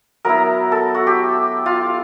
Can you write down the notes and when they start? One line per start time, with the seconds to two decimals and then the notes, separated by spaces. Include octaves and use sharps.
0.25 F#3 B3 E4 A#4
0.72 A4
0.94 F#4
1.07 G4
1.66 F4